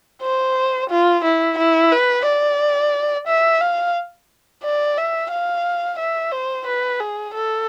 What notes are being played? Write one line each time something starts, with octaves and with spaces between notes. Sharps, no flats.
C5
F4
E4
E4
B4
D5
E5
F5
D5
E5
F5
E5
C5
B4
G#4
A4